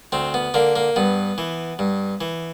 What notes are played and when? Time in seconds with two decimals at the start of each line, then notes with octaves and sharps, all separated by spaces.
0.12 D2 C4
0.34 B3
0.54 D3 A#3
0.76 A#3
0.96 G2 B3
1.38 E3
1.79 G2
2.21 E3